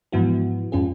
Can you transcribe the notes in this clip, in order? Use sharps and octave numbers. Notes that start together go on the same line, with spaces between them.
G#2 E3 F3 B3 E4 F#4
F2 G#2 C#4 F4 G#4